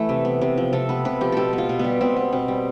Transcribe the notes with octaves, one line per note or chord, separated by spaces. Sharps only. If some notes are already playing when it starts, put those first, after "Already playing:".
Already playing: E3 A3 B4
C3
B3
C3
F3
C3 A4
B3 B4
C3 B4
F3 G4
B2 G4 A4
B3
F4
B2
G3 B3
B2 C4
B3
B2 C4
G3